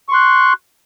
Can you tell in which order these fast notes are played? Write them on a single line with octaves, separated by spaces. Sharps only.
C#6 C6 F#6